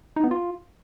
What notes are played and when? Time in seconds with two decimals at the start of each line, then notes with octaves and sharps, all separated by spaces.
0.16 D#4
0.24 B3
0.31 F4